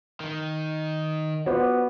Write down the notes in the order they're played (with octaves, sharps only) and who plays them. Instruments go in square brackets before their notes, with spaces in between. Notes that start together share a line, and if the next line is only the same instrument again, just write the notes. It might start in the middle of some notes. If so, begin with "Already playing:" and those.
[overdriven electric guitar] D#3
[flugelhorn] B3 [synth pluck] F4 C5 [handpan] F#4 D5